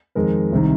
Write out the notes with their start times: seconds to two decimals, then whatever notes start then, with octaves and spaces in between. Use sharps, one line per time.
0.15 F2 D#3 G#3 A#4
0.52 C2 C3 D#3